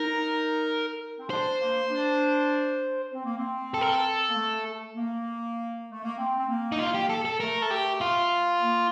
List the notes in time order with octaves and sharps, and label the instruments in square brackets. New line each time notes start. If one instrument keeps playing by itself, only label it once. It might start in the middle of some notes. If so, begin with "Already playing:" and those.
Already playing: [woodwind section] D#4 [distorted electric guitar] A#4
[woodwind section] C4
[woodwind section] D4 [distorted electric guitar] C5
[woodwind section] A#3
D4
C4
A#3
C4
[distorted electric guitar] A4
A#4
A4
[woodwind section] A#3
A3
A#3
A3
A#3
C4
C4
A#3
[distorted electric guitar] D#4
F4
G4
A4
A4
[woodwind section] A3 [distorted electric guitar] A#4
[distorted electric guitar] A4
G4
F4
[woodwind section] A#3